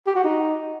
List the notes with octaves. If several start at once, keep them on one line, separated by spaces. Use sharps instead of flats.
G4
F#4
D#4